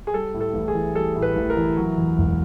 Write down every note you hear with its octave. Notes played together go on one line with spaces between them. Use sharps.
G#4
G3 A4
A2
A4
A1
G#4
E3
G3 A4
A2
B4
A1
A#4
E3
F#3
E2
E1